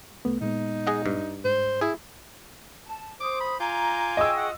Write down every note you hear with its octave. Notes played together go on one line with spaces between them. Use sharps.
C2 A3 B3
A#2 G#3 B3 D#4
G#4 D#5 F#5
G2
G#2 C5
E4 G#4
A5
C5 D6 D#6
B5
F4 G#5 A#5 D6 G6
G#4 D#5 G5 C#6 E6
F#5